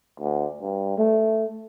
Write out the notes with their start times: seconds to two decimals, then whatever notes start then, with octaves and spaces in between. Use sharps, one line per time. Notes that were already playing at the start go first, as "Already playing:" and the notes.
0.20 D2
0.61 G2
0.98 A3